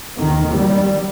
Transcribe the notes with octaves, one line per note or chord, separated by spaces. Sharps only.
D#2 D#3
G3